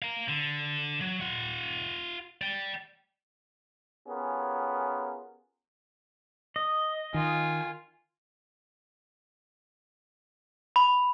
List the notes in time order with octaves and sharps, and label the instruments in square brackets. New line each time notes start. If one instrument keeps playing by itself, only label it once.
[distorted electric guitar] F5 A#5
D3
F#3
F4 F#5
D5 G5
[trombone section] B3 C#4 F4 G4 G#4 A#4
[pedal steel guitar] D#5
[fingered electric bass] D#3 [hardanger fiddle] F4 [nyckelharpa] G#5
[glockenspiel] B5